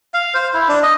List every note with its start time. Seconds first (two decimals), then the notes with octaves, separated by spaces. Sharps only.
0.14 F5
0.34 C5
0.54 E4
0.68 D4
0.83 D#5